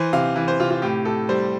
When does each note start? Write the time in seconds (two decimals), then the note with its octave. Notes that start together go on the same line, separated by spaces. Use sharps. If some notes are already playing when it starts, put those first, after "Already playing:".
Already playing: E3 C5
0.13 C3 F5
0.36 E3
0.48 C5
0.60 C3 F4
0.70 F4
0.82 A2 G4
1.05 A2 A4
1.29 G3 C5